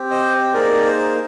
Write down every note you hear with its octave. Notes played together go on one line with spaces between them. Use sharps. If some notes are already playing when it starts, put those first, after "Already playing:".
Already playing: C4 G4
C5 D#5
A#3 D#4 G#4 A#4 D5
C5